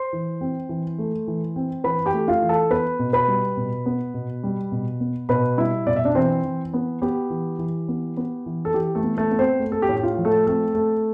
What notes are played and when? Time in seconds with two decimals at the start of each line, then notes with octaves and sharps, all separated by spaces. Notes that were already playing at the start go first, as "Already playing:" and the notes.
Already playing: C5 C6
0.13 E3
0.41 C4
0.69 E3
0.99 A3
1.27 E3
1.56 C4
1.84 E3 B4 B5
2.06 G4 G5
2.14 A3
2.28 F4 F5
2.42 E3
2.49 A4 A5
2.71 B3 B4 B5
2.99 B2
3.13 B4 B5
3.28 G3
3.57 B2
3.86 B3
4.14 B2
4.43 G3
4.72 B2
5.00 B3
5.29 B2 B4 B5
5.57 G3 E4 E5
5.86 B2 D5
5.96 E5
6.05 D4 D5
6.15 E3 C4 C5
6.44 E3
6.73 B3
7.02 B3 G4
7.30 E3
7.58 E3
7.88 B3
8.17 B3
8.46 E3
8.65 A4
8.74 E3 G4
8.95 A3 A4
9.03 B3
9.17 A3 A4
9.31 B3
9.39 C4 C5
9.60 A3
9.72 A4
9.82 G4
9.89 A2
9.97 G4
10.03 F4
10.18 F3
10.25 A3 A4
10.47 A3 C4 A4
10.75 A3